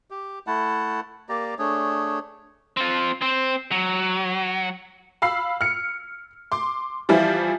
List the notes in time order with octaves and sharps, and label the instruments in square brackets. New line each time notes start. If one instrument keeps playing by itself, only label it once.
[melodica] G4
A3 E4 F#5 A5
A#3 G4 D5 A#5
A3 D4 G#4 C#5
[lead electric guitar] C4 F4
C4 C5
F#3
[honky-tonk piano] F5 B5 E6 C7
F6 C#7
C6 D6
E3 F3 G3 E4 F4